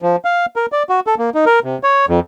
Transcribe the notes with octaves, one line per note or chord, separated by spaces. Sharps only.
F3
F5
A#4
D5
F#4
A4
A#3
D#4
A#4
C3
C#5
F2